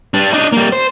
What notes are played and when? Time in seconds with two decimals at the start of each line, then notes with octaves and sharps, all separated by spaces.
0.14 G3 D4
0.33 D4 D#4
0.52 G3 A#3
0.72 C5